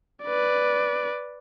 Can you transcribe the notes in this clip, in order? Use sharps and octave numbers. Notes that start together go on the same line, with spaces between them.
B4 D5